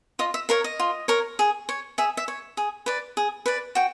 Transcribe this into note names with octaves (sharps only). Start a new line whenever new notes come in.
F4 D#5
E5
A#4 C#5 F5
D#5
F4
A#4 C#5
G#4
C#5
G#4 E5
E5
C#5
G#4
B4 D5
G#4
B4 D5
F#4 G5